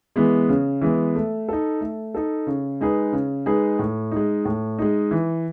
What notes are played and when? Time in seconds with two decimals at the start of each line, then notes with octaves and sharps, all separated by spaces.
0.16 E3 G#3 B3
0.49 C#3
0.82 E3 G#3 B3
1.16 A3
1.49 D#4 A4
1.81 A3
2.15 D#4 A4
2.47 C#3
2.81 G#3 D#4 G#4 B4
3.13 C#3
3.46 G#3 D#4 G#4 B4
3.79 A2
4.12 G#3 D#4
4.45 A2
4.79 G#3 D#4
5.11 E3